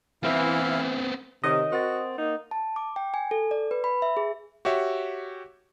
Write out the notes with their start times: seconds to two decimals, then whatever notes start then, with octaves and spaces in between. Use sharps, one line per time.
0.23 E3 B3 C4 E4 F5
1.44 C3 D#3 C#5 D#5
1.72 C4 F#4 A#4 F#5 A6
2.18 A#3 D#4
2.51 A5
2.76 D6
2.96 G5
3.14 G#5
3.31 A4
3.51 D5
3.71 B4
3.84 B5
4.02 E5
4.17 G#4
4.65 F#4 G4 C#5 E5